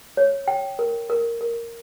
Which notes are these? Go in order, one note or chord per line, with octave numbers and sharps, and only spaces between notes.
C#5
G5
A#4
A#4
A#4